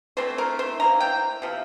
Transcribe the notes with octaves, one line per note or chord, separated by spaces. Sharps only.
E3 A3 C4 C5
A#4
C5
E3 A#3 A#5
G5
C3 F3